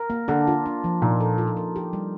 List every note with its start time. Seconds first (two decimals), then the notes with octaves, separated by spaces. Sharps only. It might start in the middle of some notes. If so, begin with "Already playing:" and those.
Already playing: A#4
0.10 A#3
0.28 D3 D4
0.47 F4
0.66 D4
0.84 F3
1.02 A#2 D#4
1.20 A4
1.38 F4
1.57 A#4
1.76 G4
1.93 G3